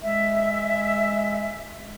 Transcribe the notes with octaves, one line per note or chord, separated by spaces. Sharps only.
G#3 E5